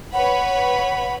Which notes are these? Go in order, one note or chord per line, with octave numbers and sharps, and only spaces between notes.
B4 C#5 F#5 B5